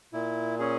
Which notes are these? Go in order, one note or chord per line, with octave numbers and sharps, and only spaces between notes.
A#2 E4
C#4 G#4